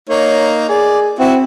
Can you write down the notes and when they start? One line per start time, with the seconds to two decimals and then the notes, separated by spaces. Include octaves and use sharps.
0.09 A#3 D#4 C#5
0.69 G#4 D5
1.19 C4 E4 F#4